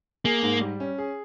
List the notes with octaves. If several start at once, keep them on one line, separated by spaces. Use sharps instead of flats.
A#3 G#4
G#2
G3
C#4
G#4